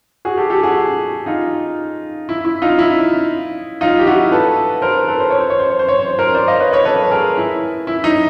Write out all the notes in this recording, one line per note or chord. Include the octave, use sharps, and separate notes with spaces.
F#4 G#4
G4 A4
G4 A4
F#4 G#4
D#4 F4
E4
E4
D#4 F4
E4
D#4 F4
G4
E4 F#4
A4 B4
A#4 C5
A4 B4
C5
C#5
C5
C#5
C5
C#5
C5
C#5
C5
C#5
A#4 C5
C5 D5
D#5 F5
B4 C#5
B4 C#5
A4 B4
G#4 A#4
E4
E4
D#4